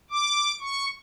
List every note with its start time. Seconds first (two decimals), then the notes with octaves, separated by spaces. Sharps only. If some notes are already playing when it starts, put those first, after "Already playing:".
0.11 D6
0.61 C#6